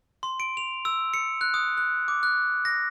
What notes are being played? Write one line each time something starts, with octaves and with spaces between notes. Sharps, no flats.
C6
D7
F7
E6
C#7
F#6
D#6
F#6
D6
F#6
A#6